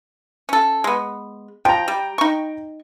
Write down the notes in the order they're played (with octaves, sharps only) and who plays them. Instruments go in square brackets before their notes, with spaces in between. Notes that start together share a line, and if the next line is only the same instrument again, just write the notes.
[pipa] C#4 A4
G#3 B3
[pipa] F3 [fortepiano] G5 A#5
[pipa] G3
D#4 C#6